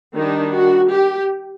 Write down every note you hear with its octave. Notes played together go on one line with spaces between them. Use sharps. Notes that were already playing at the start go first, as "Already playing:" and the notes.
D#3 G3 D4 D#4
F#4
G4